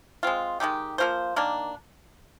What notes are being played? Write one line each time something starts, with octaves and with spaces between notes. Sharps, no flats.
G#3 C4 F4
D#3 G#3 D#4 G4
F3 A#3 F4 C5
D#3 A#3 D4